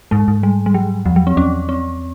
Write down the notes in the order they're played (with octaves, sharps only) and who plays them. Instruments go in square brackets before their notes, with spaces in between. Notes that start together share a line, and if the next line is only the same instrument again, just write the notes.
[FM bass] G#2 [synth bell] G#3
[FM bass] G#2
[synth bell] G3
G3
F#3
[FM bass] E2 [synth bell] F3
[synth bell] F#3
C4
[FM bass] E2 [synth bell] C#4
[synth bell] C4